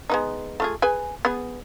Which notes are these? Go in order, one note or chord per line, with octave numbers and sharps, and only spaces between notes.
G#3 B3 D#4
A3 F4 G#4
G#4 B4 G#5
B3 G#4